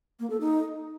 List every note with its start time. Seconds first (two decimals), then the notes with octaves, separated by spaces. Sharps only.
0.20 A#3
0.30 A4
0.40 D#4